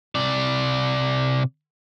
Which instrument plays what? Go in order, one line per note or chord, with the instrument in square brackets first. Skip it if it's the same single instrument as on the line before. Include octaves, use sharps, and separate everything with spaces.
[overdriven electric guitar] C3 D5